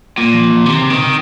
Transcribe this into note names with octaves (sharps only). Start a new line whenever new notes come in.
A#2
F3
F3
C3 D#3
C#3
D#3
C3